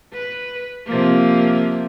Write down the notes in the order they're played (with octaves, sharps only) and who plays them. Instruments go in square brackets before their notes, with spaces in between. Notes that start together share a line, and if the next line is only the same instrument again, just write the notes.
[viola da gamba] B4
C3 F3 A#3